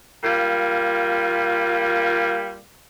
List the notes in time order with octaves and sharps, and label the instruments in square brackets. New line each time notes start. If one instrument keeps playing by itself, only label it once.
[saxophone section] G3 A#3 F4